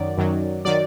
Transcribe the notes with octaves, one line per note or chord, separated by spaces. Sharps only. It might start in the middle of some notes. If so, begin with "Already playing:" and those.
Already playing: F#2 D#3 F#3 D5
F#2 D#3 F#3
D#3 F#3 D5